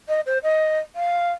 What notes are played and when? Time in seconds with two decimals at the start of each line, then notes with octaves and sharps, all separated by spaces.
0.09 D#5
0.26 C5
0.43 D#5
0.96 F5